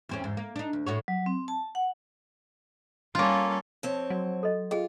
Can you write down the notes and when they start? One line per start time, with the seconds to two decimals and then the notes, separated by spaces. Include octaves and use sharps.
0.09 E2 C4 C#4
0.24 E2 G#2
0.37 A#3
0.56 D4 D#4
0.73 D2
0.86 A2 F#4 C#5
1.08 F#3
1.26 C4
1.48 A5
1.75 F#5
3.15 G3 A#3 C#4 F4 A4
3.83 F2 C4 C#5
4.10 F#3
4.43 A4 D#5
4.71 F4 G#4 D#5 G5